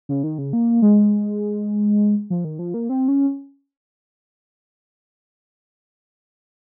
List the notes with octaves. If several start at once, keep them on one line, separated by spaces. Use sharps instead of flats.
C#3
D#3
C#3
A#3
G#3
F3
D#3
F3
A#3
C4
C#4